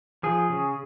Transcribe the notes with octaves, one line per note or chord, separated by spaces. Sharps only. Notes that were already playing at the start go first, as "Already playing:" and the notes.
F3 G#4
C#3